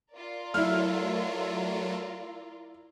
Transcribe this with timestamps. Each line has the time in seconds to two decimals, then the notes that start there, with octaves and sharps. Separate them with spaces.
0.12 F4 A#4 D5
0.54 F#3 A3 E4 F6